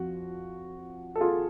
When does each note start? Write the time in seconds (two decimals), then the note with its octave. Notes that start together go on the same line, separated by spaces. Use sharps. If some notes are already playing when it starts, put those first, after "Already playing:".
Already playing: F2 F3 F#4
1.16 A4
1.21 F4 G#4